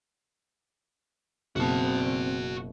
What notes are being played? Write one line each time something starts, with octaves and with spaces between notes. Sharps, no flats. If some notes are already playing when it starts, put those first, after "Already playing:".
F#1 B2 C4 F#4 A5